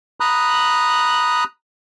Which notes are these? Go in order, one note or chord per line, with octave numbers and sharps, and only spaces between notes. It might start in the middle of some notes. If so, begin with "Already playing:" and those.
A#5 B5 D#6 F#6